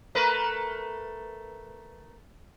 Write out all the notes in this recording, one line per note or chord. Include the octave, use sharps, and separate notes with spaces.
A3 A#4 B4